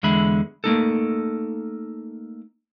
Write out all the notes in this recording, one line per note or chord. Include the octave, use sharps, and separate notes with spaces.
E2 D3 G#3 E5 B5
A3 A#3 D#4 A4